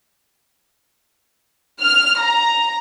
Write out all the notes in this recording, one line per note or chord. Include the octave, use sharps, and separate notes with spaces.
F6
A#5